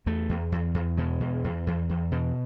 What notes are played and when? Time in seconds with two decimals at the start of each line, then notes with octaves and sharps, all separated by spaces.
0.06 E2 A3
0.29 E2
0.52 E2
0.74 E2
0.97 B2 G#3
1.20 E2
1.44 E2
1.67 E2
1.89 E2
2.12 B2